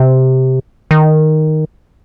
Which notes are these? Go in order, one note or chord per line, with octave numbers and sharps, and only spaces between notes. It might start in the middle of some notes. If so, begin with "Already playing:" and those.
Already playing: C3
D#3